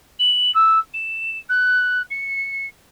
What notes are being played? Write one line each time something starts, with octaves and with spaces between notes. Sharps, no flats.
F#7
E6
E7
F#6
C#7